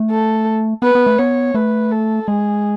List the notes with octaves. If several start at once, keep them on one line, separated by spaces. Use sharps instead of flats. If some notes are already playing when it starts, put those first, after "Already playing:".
Already playing: A3
A4
B3 B4
B3
A3
B3 C#5
A3 B4
A4
G#3 G#4